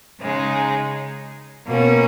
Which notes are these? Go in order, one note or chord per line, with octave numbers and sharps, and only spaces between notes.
C#3 G#3 D#4
B2 A#3 C#4